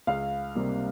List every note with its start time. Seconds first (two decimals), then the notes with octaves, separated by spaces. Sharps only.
0.07 C#2 F5
0.55 C3 G3 A#3